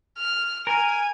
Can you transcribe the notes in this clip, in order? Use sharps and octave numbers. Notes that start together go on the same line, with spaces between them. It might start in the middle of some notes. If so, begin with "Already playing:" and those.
F6
A#4 G#5